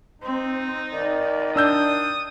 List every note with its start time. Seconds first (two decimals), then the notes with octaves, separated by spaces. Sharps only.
0.22 C4 D#4
0.93 D#3 D5
1.56 D4 D#6 E6 G6